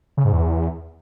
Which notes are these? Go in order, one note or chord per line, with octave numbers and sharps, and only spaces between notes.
C#3
G#2
E2